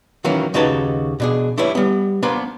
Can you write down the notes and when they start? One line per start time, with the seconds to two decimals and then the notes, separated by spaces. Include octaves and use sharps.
0.24 D#3 E3 F#3 A#3 C#4
0.54 D#2 C#3 D#4 F#4 B4 A5
1.20 B2 D4 G#4
1.58 D4 E4 G4 B4 C#5
1.75 G3 B3
2.23 A#3 B3 D4 B4 C5